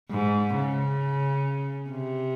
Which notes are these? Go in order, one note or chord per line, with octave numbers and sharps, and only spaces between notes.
G#2
C#3
C3